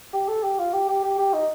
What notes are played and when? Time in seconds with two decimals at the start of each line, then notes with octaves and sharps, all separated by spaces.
0.13 G4
0.28 A4
0.43 G4
0.59 F4
0.73 G4
0.88 G4
1.04 G4
1.18 G4
1.33 D#4